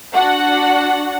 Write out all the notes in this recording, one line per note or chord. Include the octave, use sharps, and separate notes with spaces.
D4 F#4 F#5